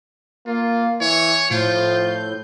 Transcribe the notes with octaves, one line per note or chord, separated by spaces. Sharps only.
A#3 F4
E3 C#5
A2 F3 F4 G6